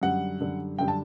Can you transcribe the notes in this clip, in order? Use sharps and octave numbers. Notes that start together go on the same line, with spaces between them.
F#2 D3 G3 F#5
F#2 D3 G3
F#2 D3 G3 G5
A5